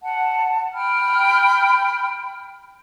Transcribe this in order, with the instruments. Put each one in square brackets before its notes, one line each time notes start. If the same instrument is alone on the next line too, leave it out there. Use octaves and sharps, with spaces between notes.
[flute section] F#5 A5
G5 B5 F6